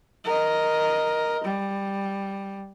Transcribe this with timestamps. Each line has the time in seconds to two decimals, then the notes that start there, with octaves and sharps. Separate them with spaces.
0.25 A#4 D#5
1.44 G3